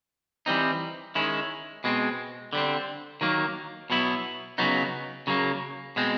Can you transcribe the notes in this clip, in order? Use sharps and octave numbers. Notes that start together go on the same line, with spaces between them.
E3 G3 C4 D#4
D#3 G#3 C#4 E4
B2 G#3 C4
D3 G3 C4
D#3 F#3 A#3
B2 F#3 B3 E4
C#3 F#3 B3 D#4
C#3 F#3 A#3
B2 G#3 C4